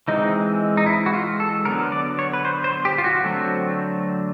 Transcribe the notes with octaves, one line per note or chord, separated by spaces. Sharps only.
E3 G#3 C4 D#4
D#4
E4
F#4
F4
A4
D3 F#3 B3 A#4
D5
C#5
B4
C5
C5
G4
F4
F#4
D3 F#3 A3 C4